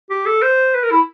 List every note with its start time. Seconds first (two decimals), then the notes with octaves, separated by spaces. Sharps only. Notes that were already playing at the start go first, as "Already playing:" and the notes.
0.10 G4
0.26 A4
0.42 C5
0.75 B4
0.83 A#4
0.91 E4